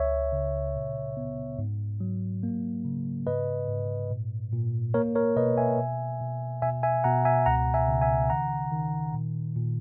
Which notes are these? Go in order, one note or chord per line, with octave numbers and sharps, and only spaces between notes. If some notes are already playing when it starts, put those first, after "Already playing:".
Already playing: C#2 C#5 E5
C#3
A#2
B3
G#2
F#3
A#3
C#3
G#2 B4 D#5
G#2
A#2
A#2
A#3 A#4 C#5
A#4 C#5
B2 B4 D#5
E5 G#5
B2
B2
B2 E5 G#5
E5 G#5
B2 F#5 A#5
E5 G#5
C#2 F#5 A#5
E5 G#5
C#3
E5 G#5
D#3 F#5 A#5
D#3
A#2
A#2